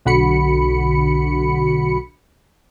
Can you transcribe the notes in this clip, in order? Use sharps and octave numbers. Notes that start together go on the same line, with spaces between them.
B1 D3 F#4 B5 C#7